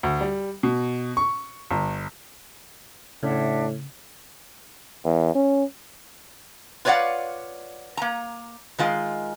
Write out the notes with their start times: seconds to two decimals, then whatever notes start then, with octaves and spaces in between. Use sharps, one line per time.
0.03 D2
0.21 G3
0.63 B2
1.17 C#6
1.71 G1
3.23 A2 C#3 D4 E5 F#5
5.05 E2
5.34 C#4
6.85 F4 B4 C#5 D5 F5 F#5
7.97 A#3 A#5
8.78 D#3 G#3 F4